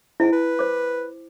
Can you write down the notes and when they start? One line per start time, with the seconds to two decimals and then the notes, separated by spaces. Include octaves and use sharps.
0.20 G#2 E4 G#5
0.33 B4
0.59 C5 D6